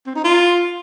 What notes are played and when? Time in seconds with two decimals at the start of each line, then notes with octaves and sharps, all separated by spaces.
0.06 C4
0.15 D#4
0.24 F4